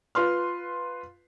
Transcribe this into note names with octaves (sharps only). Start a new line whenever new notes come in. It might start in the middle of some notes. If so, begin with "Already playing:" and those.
F4 B4 C6 F6